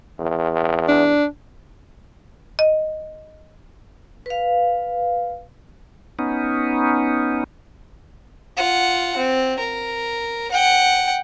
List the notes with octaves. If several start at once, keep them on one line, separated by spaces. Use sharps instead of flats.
E2
D4
D#5
B4 F5
B3 C#4 D#4
F4 F#5
C4
A#4
F#5 G5